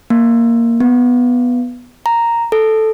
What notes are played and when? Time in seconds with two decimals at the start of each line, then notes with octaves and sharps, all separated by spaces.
0.10 A#3
0.80 B3
2.06 A#5
2.52 A4